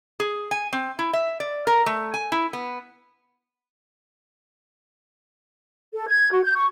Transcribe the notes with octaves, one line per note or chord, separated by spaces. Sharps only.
G#4
G#5
C4
E4
E5
D5
A#4
A3
G#5
E4
B3
A4
G#6
F#4
G6
C#6